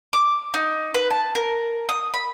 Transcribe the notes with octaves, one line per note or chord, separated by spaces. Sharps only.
D6
D#4
B4
A5
A#4
D#6
B5